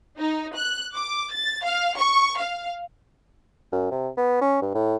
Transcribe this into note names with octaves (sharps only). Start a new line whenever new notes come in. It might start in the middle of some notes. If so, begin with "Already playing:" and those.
D#4
F#6
D6
A6
F5
C#6
F5
F#2
C3
B3
C#4
G2
A2